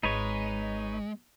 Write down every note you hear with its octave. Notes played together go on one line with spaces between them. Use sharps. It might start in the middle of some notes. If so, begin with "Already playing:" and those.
G#1 G#3 D#4 B4 C#5